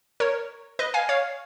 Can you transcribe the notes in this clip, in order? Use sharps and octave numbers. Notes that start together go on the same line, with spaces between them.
A#4 C#5
B4 D#5
F5 G#5
C#5 F5